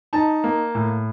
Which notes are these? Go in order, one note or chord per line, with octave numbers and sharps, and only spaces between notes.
D#4 A5
A#3
A2